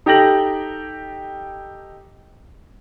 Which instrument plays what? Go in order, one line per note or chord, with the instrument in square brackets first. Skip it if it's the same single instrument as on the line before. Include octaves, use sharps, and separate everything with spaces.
[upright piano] D#4 G4 A4 G5 A#6 F#7